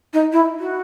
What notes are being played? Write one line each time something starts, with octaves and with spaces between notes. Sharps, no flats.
D#4
E4
F#4